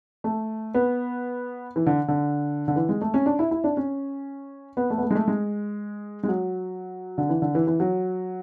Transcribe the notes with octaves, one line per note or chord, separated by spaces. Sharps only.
A3
B3
E3
D3
D3
D3
E3
G#3
A3
C#4
D4
E4
E4
D4
C#4
B3
A3
B3
A3
G#3
A3
G#3
G#3
F#3
D3
E3
D3
E3
E3
F#3